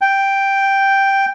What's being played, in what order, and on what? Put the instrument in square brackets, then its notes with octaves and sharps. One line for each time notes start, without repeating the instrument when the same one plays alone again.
[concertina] G5